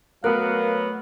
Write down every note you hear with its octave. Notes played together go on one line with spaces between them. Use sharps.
F#3 A3 B3 A#4 F5 F#6